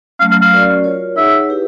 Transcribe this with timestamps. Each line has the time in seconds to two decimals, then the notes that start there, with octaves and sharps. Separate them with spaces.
0.19 F#3 A3 C#4 F5
0.31 F5
0.42 F5
0.52 C#4 F#4 A#4 D5
0.84 F4 A#4 C#5
1.16 D#4 G#4 C#5 E5 F#5
1.49 E4 G4 B4